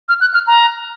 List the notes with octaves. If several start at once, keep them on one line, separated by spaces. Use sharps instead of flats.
F6
F#6
F6
A#5